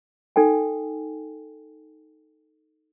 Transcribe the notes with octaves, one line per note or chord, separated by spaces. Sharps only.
D#4 A4 G5 G#5